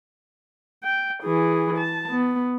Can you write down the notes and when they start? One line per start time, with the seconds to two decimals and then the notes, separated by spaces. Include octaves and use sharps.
0.84 G5
1.23 E3 G#4
1.78 A5
2.10 B3